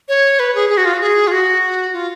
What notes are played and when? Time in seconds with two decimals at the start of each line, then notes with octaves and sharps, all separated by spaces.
0.08 C#5
0.39 B4
0.55 G#4
0.70 G#4
0.77 F#4
0.85 F4
0.94 F#4
1.01 G#4
1.27 F4
1.32 F#4
1.93 F4